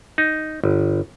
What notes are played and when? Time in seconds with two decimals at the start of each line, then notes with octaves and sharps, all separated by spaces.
0.18 D#4
0.64 G1